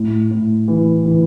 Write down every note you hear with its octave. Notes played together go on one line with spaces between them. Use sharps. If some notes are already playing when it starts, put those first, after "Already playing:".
Already playing: A2
A2
E3
E3